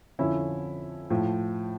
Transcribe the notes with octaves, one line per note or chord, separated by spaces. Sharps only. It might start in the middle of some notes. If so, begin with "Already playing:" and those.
F2 D3 F3 C#4 E4
A2 F3